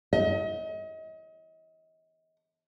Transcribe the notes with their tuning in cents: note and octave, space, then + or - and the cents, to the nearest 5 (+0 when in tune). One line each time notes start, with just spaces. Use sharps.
D#5 +35